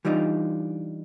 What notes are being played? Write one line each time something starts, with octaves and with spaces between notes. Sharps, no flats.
E3 G3 D4 D#4 F4